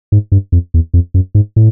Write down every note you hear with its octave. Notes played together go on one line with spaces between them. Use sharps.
G#2
G2
F2
E2
F2
F#2
G#2
A2